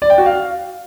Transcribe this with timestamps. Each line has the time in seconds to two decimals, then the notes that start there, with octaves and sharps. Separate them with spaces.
0.02 D5
0.10 G5
0.18 F#4
0.26 F5